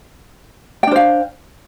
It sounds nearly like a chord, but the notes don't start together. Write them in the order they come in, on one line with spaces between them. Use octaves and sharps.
G5 D4 C5 F5